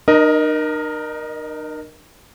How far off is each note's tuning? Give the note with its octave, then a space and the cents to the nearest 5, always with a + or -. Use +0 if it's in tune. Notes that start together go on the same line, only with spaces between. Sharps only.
D#4 -40 A#4 +15 D#5 +0